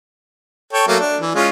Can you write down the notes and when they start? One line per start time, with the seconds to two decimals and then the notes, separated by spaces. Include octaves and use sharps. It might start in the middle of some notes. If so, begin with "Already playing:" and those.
0.73 A4 C#5 G5
0.87 F#3 A3 A#3
0.99 D4
1.20 E3
1.35 G#3 C#4 F4